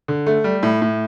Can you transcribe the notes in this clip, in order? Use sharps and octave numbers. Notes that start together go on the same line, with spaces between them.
D3
A3
G3
A2
A2